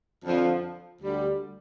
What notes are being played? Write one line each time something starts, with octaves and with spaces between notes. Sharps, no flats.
F2 D3 F3
D2 D3 G3